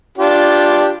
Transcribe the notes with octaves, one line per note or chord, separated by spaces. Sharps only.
D4 F4 G4